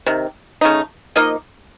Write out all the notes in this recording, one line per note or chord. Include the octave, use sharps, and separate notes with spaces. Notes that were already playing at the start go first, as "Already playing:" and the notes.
C3 D#3
C#3 A3 D#4
F3 A#3 D#4 D#5